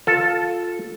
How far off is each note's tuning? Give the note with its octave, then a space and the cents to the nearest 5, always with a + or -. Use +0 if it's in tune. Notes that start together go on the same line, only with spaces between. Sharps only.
F4 +10 A4 +0